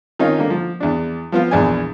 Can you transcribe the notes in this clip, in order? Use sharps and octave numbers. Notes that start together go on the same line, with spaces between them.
D#3 C#4 D#4 F4
D3 A#3
F3
E2 D4
F3 B3 F4
A#1 E2 D4 G#5